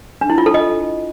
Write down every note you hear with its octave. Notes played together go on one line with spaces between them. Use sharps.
D4
E4
F4
A4
D#5